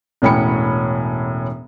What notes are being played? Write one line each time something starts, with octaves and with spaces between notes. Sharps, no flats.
E1 A2 C#4 G5 B5 C#7